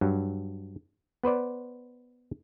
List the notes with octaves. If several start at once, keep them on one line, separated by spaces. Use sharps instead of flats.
G2 F#3
B3 B4 C5 D5